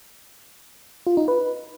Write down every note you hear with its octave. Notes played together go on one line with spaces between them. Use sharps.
F4
D#4
B4